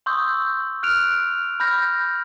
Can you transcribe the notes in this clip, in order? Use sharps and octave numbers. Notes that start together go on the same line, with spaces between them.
C6 C#6 D#6 E6 G6
F6 F#6 D7 F7
B5 F6 G6 A#6